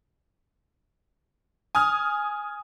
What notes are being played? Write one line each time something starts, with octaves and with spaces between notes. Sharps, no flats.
G#5 D#6 F6